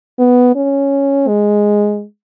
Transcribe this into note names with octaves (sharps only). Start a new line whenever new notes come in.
B3
C#4
G#3